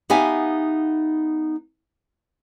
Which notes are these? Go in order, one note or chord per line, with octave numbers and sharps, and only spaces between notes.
B3 D#4 G4 E5 F5 G#5